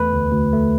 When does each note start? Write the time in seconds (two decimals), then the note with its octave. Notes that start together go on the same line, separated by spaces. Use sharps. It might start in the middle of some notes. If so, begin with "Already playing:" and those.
Already playing: E2 A3 B4
0.13 D2
0.33 D2
0.53 A3